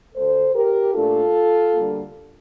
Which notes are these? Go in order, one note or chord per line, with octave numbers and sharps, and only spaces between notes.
D2 D3 A3 A4 C5
G4 A#4
A#2 A3 D4 F4 A4
D2 D3 G3 A#3